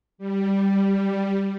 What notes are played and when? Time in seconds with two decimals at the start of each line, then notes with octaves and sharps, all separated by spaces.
0.18 G3